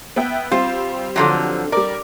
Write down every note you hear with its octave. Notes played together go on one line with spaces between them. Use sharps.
B3 E5 G5
G3 C4 F4 C5
D3 F3 F#3
G3 A#4 D5